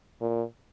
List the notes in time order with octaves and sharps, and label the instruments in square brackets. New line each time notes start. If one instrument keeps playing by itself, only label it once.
[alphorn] A#2